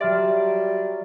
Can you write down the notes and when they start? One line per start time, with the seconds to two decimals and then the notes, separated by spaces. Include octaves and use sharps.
0.01 F#3 G3 D5 E5 C6 F6